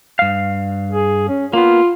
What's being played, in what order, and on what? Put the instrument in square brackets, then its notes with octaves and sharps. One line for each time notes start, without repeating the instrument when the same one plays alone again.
[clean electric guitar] G2 F5
[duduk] G#4
C#4
[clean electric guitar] A#3 B3 [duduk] F4